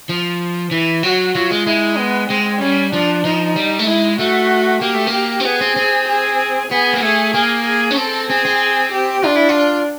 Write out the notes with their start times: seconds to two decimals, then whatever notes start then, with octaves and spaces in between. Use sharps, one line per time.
0.09 F3
0.71 E3
1.03 F#3 F#4
1.35 F#3 F4
1.51 G#3
1.67 G#3 E4
1.98 B3
2.30 G#3 C4
2.61 G3 C#4
2.93 F3 D4
3.25 F3 D#4
3.56 G3
3.79 A3
3.87 G#3 E4
4.19 A3 F#4
4.81 A#3 G4
4.94 A3
5.07 A#3
5.40 C4
5.45 B3 G#4
5.61 C4
5.76 C4
6.08 G#4
6.71 B3 G#4
6.94 A#3
7.02 A3 G#4
7.34 A#3 G#4
7.66 G#4
7.91 C#4
7.97 C4 A4
8.30 C4 G#4
8.45 C4
8.92 G4
9.24 D4 F4
9.36 E4
9.49 F4